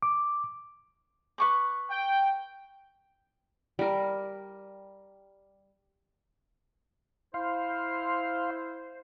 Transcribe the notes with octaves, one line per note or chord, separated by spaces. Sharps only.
D6
B4 C#6 D6
G5
G3 A#4
E4 C5 F5 C6